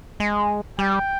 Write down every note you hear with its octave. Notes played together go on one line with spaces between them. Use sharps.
G#3
G3 G5